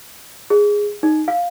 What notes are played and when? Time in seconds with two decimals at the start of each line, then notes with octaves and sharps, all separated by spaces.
0.50 G#4
1.03 D#4
1.28 F5